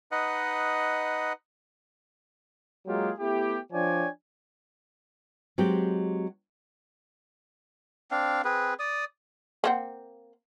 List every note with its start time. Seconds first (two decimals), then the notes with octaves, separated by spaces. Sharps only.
0.11 D#4 B4 D#5 F#5
2.86 F#3 G#3 A#3 F4 G4 G#4
3.19 A3 B3 E4 G4
3.72 F3 D4 C#5 D5 G5 G#5
5.58 F#3 G#3 C4 G4
8.11 C4 D4 F5
8.45 C4 G#4 B4
8.79 D5 D#6
9.64 A#3 C4 F#5